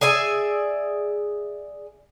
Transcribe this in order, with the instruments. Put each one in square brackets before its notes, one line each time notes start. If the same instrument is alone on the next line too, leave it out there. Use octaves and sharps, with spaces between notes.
[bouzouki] G#4 D5 E5 G#5